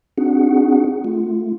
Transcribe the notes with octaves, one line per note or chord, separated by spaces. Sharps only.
C4 D4 D#4 F#4 G#4 F#5
A3 F4